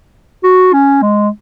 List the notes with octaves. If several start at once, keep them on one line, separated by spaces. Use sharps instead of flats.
F#4
C#4
G#3